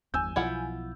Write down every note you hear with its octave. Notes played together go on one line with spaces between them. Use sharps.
G1 E2 G2 G#5 E6 G6
B1 B2 F3 E4 F4 F#5